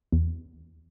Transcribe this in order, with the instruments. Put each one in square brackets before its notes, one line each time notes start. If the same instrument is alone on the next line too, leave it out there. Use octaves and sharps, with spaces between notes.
[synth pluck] E2